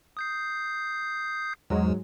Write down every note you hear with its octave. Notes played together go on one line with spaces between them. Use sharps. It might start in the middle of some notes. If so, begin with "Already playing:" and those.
D#6 G6 C7
E2 G#2 F#3 G#3